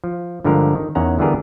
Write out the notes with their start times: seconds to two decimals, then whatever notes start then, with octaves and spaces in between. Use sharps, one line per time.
0.04 F3
0.44 G2 D3 F3 G#3 A#4
0.75 D#3
0.95 E2 D#3 C#4 F#5 A#5
1.19 D3 E3 G3 B3 G#4 A#4